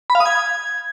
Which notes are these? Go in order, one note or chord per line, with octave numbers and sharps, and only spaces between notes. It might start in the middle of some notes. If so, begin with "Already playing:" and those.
B5
F5
D#6
G#6